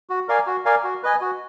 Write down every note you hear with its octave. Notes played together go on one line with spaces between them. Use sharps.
F#4
A#4 D5 F5 G#5
F#4
A#4 D5 F5 G#5
F#4
B4 D#5 G#5
F#4